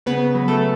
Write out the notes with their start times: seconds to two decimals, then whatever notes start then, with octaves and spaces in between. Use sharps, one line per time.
0.06 C#3 B3 B4
0.35 F#3
0.48 A3 A4